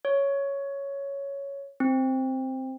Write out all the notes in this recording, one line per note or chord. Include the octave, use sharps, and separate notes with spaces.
C#5
C4